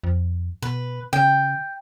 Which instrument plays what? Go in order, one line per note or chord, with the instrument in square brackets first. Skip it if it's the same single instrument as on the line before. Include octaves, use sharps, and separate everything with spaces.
[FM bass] F2
[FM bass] B2 [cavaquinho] B4
[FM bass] C#3 [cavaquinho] G5